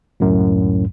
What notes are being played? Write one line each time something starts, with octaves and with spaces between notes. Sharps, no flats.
C#2 F#2 A2